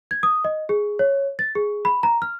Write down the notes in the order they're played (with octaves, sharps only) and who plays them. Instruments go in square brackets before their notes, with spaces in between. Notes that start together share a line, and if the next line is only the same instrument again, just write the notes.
[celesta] G#6
D#6
D#5
G#4
C#5
A6
G#4
B5
A#5
F6